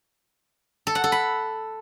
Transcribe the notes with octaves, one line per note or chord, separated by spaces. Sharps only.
A4
F#5
A4
B5